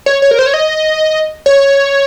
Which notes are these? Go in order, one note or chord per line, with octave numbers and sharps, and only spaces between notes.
C#5
C#5
A#4
C5
C#5
D#5
C#5